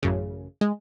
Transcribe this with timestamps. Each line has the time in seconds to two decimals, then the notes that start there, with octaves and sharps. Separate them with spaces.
0.03 A1 F#2 C#3
0.61 G#3